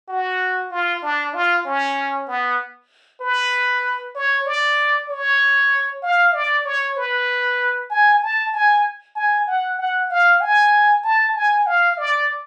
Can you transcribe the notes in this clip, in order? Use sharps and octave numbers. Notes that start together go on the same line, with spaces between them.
F#4
F4
D4
F4
C#4
B3
B4
C#5
D5
C#5
F5
D5
C#5
B4
G#5
A5
G#5
G#5
F#5
F#5
F5
G#5
A5
G#5
F5
D5